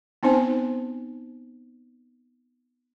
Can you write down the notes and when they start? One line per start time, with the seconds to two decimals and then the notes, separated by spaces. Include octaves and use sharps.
0.23 B3 C4 D#4 C5 G#5